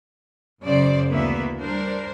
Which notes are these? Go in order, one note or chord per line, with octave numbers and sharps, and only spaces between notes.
F#2 C#3 C5 D5
D2 E3 A#3 B3 E5
G3 D4 A#4 C5